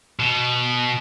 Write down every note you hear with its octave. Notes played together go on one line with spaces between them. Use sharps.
B2